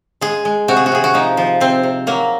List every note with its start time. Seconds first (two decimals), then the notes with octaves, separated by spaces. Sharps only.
0.21 G#3 G#4
0.45 G#3
0.68 C3 F#4
0.77 G#4
0.86 F#4
0.92 C3 G#4
1.04 F#4
1.14 F3 D#4
1.37 F3
1.60 C3 C4
1.83 C3
2.07 F#3 A#3